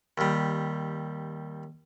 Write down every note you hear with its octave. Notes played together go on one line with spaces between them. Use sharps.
D#2 G3